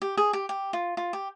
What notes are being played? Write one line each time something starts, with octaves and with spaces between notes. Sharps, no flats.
G4
G#4
G4
G4
F4
F4
G4